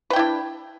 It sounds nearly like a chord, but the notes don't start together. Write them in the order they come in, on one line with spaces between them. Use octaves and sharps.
B4 G5 E4 D4